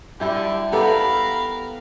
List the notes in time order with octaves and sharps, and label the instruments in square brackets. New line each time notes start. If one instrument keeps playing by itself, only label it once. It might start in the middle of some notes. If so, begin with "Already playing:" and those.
[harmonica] D3 [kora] G3 E4 G4
[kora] B3 G4 A4 [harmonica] A#4 F5 B5